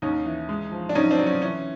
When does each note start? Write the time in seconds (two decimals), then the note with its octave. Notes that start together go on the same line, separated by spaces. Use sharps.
0.02 D#2 C#4 D#4
0.26 E3
0.49 G#3
0.72 F3
0.89 D4
0.95 F#3 C#4 D#4
1.11 C4 D4
1.18 F#3
1.26 C#4
1.42 E3 C#4